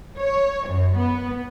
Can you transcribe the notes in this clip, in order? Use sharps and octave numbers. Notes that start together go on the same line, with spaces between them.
C#5
F#2
B3